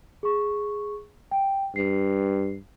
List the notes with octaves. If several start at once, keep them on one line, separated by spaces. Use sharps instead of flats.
G#4 C#6
G5
G2 C7